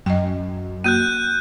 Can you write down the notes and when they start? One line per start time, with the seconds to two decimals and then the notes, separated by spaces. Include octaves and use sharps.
0.06 F#2 D#5 G5
0.84 A#3 F#4 F#6 G6 D#7